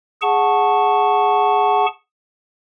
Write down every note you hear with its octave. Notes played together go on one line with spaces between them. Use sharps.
G#4 F#5 A5 C#6